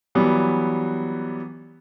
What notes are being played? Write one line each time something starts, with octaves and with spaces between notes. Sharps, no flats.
E3 F#3 G3 B3